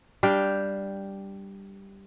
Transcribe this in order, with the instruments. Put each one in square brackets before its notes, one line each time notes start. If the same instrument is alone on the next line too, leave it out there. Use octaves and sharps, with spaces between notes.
[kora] G3 D4 F5 G5